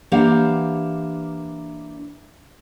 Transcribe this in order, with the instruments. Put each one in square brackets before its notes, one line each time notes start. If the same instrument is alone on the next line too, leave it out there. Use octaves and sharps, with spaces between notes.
[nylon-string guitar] E3 A#3 D4 G4 F5 F#5